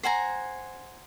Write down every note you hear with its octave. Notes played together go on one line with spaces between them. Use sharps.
C5 F#5 G#5 A#5